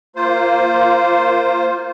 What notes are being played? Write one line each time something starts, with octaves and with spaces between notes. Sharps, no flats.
A#3 F4 C5